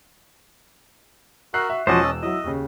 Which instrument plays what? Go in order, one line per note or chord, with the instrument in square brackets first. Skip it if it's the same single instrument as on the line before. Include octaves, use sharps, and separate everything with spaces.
[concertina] F#4 A#4 E5 [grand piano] A#5 F#6 C7
[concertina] F#4 [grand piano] E5
[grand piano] E1 D6 [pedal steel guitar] F3 F#4 C5 [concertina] C#4 D#5 A5
[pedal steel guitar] E6
[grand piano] F#3 E4 [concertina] D#5
[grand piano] D#2 C#3